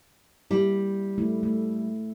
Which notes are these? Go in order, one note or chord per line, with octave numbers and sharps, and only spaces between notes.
G3 A#3 E4
A3 E4
A3